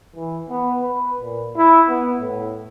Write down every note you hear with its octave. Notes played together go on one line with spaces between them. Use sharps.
E3
B3
B4
A#2
E4
B3
A2